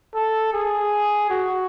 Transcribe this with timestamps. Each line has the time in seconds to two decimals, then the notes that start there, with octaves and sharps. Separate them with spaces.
0.15 A4
0.53 G#4
1.30 F#4